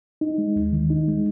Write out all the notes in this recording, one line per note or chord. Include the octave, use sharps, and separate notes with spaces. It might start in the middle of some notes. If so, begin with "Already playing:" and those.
D#4
G#3
D#2
D#3
D#4
G#3